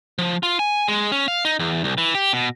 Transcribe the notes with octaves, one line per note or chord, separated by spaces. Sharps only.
F3
F4
G#5
G#3
C#4
F5
D#4
E2
C2
E3
G4
B2